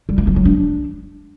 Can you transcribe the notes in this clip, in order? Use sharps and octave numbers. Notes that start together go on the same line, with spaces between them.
G3
A#3
F3
F#3
D4